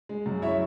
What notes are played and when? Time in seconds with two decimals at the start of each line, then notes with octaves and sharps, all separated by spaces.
0.09 G#3
0.26 F#2
0.42 E4 C#5 E5